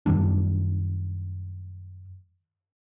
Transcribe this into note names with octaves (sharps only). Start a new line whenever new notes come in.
F#2 D#3 G3 D4